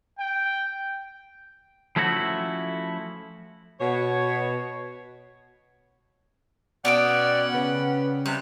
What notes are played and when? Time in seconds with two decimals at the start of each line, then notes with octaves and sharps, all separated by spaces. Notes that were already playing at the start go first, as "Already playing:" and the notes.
0.19 G5
1.96 F3 A3 C#4 E4 F#4
3.81 B2 C#5
6.85 B2 B3 C#4 D5 F#5 G5 E6
7.54 C#3 B4
8.26 C3 G3 F#6